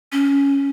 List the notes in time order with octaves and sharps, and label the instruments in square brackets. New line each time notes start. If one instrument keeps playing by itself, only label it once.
[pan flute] C#4